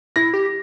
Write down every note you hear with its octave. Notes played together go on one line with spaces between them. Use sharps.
E4 A#6
G4